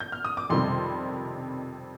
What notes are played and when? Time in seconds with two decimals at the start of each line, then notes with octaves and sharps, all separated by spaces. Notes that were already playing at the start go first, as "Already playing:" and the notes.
0.00 G6
0.12 F6
0.25 D#6
0.37 D6
0.50 F2 C3 D#3 G3 C6